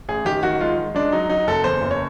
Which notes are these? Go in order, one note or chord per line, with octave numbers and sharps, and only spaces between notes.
A1 G#4
D#3 G4
D#3 F#4
G#3 F4
G#3
G#3 D4
F#3 D#4
F#3 D#4
F#1 A4
E2 C5
F#1
C#5